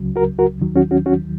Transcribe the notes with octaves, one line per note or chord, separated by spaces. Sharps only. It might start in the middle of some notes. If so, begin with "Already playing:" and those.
Already playing: C#2 C#3 F#3
F#4 A#4
F#4 A#4
D#2 D#3 F#3
C#4 F#4
C#4 F#4
C#4 F#4